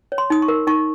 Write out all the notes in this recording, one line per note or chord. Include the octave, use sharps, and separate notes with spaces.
C#5
C6
D#4 D#6
C#6
A#4
D#4 C#6